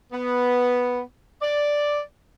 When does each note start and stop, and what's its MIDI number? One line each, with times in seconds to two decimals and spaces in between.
0.12 1.01 59
1.42 2.01 74